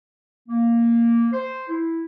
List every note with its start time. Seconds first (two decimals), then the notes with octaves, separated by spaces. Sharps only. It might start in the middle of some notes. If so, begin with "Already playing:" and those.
0.49 A#3
1.33 C5
1.69 E4